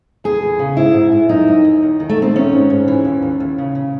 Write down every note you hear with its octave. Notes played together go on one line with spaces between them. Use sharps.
E2 G#4
E2
C#3
G#2 E4
G#2
G#2
F#2 D#4
F#2
F#2
D#2
D#3
A3
D#2
C4
D#3 C#4
G#2
G#2
E3
D#2
D#2
D#2
C#3
C#3